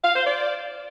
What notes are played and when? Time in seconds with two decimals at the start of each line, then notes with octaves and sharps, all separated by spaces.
0.03 F5
0.14 C5
0.26 D5